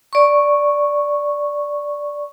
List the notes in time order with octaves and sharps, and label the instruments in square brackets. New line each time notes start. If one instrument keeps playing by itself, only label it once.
[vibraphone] D5 C#6